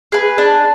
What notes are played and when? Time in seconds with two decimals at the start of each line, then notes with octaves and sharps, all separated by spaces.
0.12 G#4 B4
0.38 D4